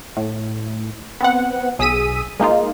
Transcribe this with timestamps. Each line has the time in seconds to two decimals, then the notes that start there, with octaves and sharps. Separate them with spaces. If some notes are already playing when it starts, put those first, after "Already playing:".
0.17 A2
1.20 B3 C4 F#5
1.79 B1 G#4 D#6 E6 B6 D#7
2.40 G#3 A#3 D#4 F4